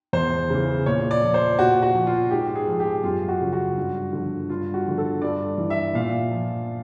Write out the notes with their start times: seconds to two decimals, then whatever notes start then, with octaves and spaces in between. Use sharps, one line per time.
0.13 E2 C5
0.50 C#3 E3
0.86 A#2 C#5
1.11 D5
1.23 F3
1.34 C5
1.59 A#2 F#4
1.83 F#4
1.95 F3
2.07 F4
2.31 G#2 G4
2.55 G#4
2.68 F3
2.80 G4
3.03 F#2 F4
3.28 F#4
3.41 C#3 F3
3.53 F#4
3.77 G2
4.13 D3 F3
4.50 G2 F4
4.74 F#4
4.86 D3 F3
4.98 A4
5.22 G2 D5
5.58 E3
5.70 E5
5.94 A#2 F5
6.31 F3